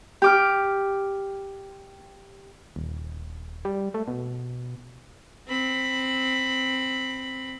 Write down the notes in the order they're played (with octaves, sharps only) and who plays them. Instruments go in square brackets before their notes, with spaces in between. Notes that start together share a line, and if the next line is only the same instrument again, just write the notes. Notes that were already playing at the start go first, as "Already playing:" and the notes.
[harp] G4 D6 F6
[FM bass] D#1
G3
A3
B2
[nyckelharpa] C4 B5